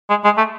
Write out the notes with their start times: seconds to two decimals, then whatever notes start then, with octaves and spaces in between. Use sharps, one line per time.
0.10 G#3
0.24 G#3
0.37 A3